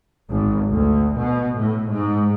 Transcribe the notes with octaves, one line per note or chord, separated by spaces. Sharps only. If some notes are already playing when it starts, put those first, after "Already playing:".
G#1
D2
B2
A2
G#2